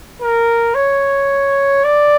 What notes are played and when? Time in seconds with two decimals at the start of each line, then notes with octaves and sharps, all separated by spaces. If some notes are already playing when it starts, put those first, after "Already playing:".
0.21 A#4
0.74 C#5
1.84 D5